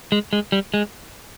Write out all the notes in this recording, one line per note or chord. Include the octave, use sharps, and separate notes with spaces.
G#3
G#3
G3
G#3